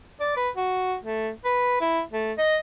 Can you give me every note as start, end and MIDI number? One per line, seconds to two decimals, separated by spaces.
0.20 0.36 74
0.37 0.49 71
0.57 0.96 66
1.03 1.31 57
1.45 1.81 71
1.81 2.02 64
2.12 2.33 57
2.38 2.58 75